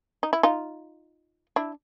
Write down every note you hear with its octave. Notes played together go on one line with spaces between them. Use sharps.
D#4
E4
D#4 F4
D4 E4